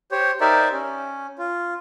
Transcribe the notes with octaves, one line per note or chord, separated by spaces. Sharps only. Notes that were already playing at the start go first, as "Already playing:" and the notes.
G4 C5 C#5
D#4 G4 A#4 C5 D5 E5
C#4
F4